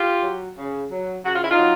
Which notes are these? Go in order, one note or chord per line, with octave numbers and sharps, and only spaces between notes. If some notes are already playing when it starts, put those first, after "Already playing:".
Already playing: F4 G4
F#3
C#3
F#3
C#3 F#4
F4
E4
D#4 F4
F#3